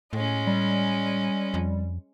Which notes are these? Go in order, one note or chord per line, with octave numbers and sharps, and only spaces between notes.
A2 G#3 C#4
G3
F2